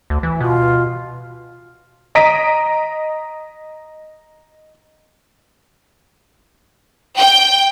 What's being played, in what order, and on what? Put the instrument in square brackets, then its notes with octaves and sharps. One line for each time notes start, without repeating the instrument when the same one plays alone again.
[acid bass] D2
E3
[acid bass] B2 [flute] F4
[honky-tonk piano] D#5 A#5 D#6 B6 D7
[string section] G5